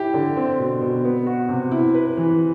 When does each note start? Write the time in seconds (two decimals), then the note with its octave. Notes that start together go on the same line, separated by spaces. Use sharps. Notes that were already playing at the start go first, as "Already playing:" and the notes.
Already playing: E4 G4
0.14 D3
0.37 C4
0.59 B2
0.81 B2
1.04 B3
1.27 F#4
1.49 C3
1.72 E4
1.94 B4
2.17 E3